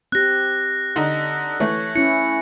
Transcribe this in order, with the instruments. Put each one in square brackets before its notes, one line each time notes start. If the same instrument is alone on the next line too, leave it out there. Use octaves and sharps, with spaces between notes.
[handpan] C4 G4 [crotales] F#6 A#6
[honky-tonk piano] D3 D#4
[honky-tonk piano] E3 A3 [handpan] C#5
[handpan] C#4 E4 [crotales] C#7